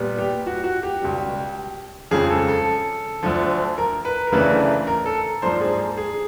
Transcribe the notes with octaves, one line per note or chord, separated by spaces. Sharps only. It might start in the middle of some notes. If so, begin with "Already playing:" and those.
Already playing: A#2 G3 B3
G4
F#4
F#4
G4
C#2 B2 G3
F2 C#3 F3 G#3 G#4
A4
A4
D2 D3 F3
A#4
B4
A#4
D2 C#3 E3 A3 D4 B4
A#4
A4
G#2 F3 A#3 D4 C5
G#4
G#4